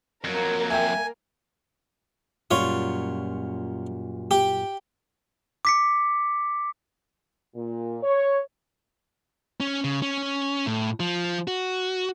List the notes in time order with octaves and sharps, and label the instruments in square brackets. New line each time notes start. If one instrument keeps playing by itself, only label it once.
[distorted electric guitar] F2 F#3 [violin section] A#3 A#4
[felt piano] E5 G5 [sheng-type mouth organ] G#5
[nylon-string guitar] F#2 A#2 G3 [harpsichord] F4 C#5
[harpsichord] G4
[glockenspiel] D6 B6 C#7
[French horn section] A#2
C#5
[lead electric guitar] C#4
C#3
C#4
A2
F3
F#4